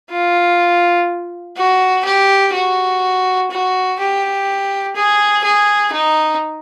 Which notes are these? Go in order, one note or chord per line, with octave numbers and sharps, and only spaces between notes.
F4
F#4
G4
F#4
F#4
G4
G#4
G#4
D#4